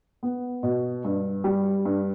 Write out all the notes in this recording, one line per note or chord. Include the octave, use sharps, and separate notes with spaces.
B3
B2
G2
G3
G2